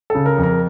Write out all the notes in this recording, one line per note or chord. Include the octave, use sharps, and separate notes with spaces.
C#3 A4
A#4
F2
A#4